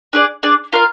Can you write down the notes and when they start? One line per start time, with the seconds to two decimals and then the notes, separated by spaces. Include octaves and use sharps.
0.13 D4 G#4 D5
0.43 D4 G#4 D5
0.73 F4 A#4 F5